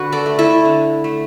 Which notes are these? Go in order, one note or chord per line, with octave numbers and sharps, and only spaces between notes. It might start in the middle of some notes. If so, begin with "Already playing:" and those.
Already playing: D3 F#4 B4
A4 D5
A3
E4 A4
D3
A3